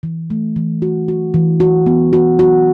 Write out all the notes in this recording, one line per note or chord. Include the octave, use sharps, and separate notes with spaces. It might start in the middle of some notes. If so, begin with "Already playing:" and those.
E3
A3
E3
F#4
F#4
E3
F#4
B3
F#4
F#4